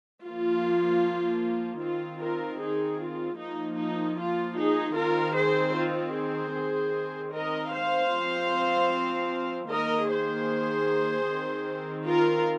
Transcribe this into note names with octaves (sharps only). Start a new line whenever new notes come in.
F3 A#3 F4
D#3 C4 F4
F4 A#4
D#4 G#4
F4
F3 A#3 D#4
D#4
F4
D#4 G#4
D#3 C4 F4 A#4
G#4 C5
F4
G#4 C5
D#3 C4
A#4 D#5
C5 F5
F3 C4
D#3 A#3 A#4 D#5
G#4 C5
D#3 C4
F4 A#4